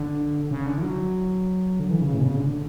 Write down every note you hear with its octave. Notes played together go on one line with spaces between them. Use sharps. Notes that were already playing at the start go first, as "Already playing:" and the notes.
Already playing: D3
C#3
D3
E3
F#3
D3
E3
C#3
A2
B2
C#3
D3